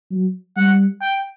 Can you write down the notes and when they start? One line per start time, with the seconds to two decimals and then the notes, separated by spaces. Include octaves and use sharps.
0.11 F#3
0.57 G3 F#5
1.02 G5